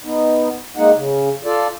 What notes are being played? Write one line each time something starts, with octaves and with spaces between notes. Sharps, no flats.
B3 D#4
G#3 A#3 D#4 F#5
C#3
F4 A4 D5